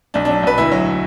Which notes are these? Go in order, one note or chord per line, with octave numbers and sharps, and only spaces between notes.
B1 D4
D4
F#3
B1 B4
D2 E4
F#3